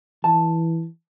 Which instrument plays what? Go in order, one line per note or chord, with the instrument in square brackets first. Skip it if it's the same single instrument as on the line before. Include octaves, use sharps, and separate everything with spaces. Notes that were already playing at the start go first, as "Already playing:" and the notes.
[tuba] E3 [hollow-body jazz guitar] A5